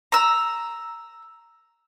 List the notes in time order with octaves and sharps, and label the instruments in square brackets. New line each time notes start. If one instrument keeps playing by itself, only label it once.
[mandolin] A#5 E6